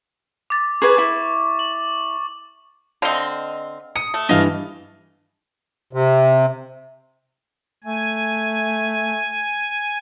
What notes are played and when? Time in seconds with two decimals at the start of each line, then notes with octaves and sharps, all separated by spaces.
0.50 D6 A6
0.82 G#4 B4 G#5 C#6
0.98 E4
1.59 F#7
3.02 D3 C4 D#5 F5
3.96 D#6 C#7
4.14 A3
4.29 G2 E3 D#5 F5
5.93 C3
7.84 A3 G#5